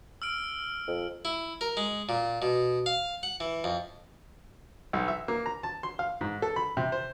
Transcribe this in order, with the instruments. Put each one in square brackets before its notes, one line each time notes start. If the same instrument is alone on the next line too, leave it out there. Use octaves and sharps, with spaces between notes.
[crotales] E6 F6 D7
[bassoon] F2
[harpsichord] E4
A#4
G#3
A#2
B2
F5
F#5
E3
F2
[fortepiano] B1
E5
A#3
A#5
A5
C6
F5
G#2
A4
B5
C3
C5